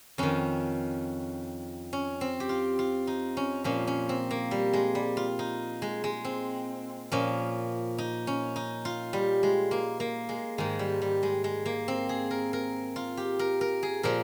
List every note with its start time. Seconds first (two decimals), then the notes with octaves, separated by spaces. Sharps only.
0.18 F2 D#3 C#4
1.93 C#4
2.21 C4
2.40 G4
2.49 F4
2.79 F4
3.07 D#4
3.37 C#4
3.64 A#2 F3 C#4
3.87 C#4
4.09 C4
4.31 A#3
4.51 G3
4.73 G#3
4.95 G3
5.17 F4
5.39 D#4
5.82 G#3
6.04 G#3
6.25 C4
7.12 A#2 F3 C#4
7.98 D#4
8.27 C#4
8.56 D#4
8.85 F4
9.13 G3
9.43 G#3
9.71 A#3
10.00 A#3
10.29 G#3
10.58 G#2 D#3 G#3
10.79 G3
11.02 G3
11.23 G#3
11.44 G#3
11.65 A#3
11.88 C4
12.09 G#4
12.31 A#4
12.53 A#4
12.96 F4
13.17 G4
13.39 A#4
13.61 A#4
13.83 G#4
14.03 A#2 F3 A#4